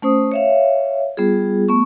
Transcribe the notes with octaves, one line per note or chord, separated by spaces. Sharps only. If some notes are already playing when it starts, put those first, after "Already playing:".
A3 C#4 C5 D#6
C#5 E5 F5
G3 B3 F4 G#4
A3 B3 C#6